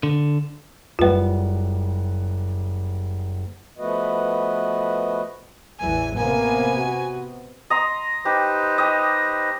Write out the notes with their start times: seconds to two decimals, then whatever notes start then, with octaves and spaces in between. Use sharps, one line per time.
0.03 D3
0.99 F#1 G3 F4 B4 F#5
3.78 F3 A3 B3 F#4 B4 D#5
5.80 A1 E2 E3 G#5
6.17 C3 A#3 B3 G#5
6.78 F#4
7.70 D#5 A#5 C6
8.25 D#4 G4 B4 C5
8.78 G4 D#5